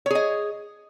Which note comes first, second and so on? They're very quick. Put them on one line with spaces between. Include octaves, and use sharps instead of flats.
C#5 G#4 D#5